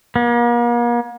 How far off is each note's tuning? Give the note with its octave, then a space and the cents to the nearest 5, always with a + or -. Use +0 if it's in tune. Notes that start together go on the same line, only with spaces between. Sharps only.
A#3 +40